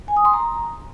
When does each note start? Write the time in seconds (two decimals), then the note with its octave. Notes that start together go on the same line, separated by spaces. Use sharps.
0.08 G#5
0.17 D#6
0.25 C6
0.34 A#5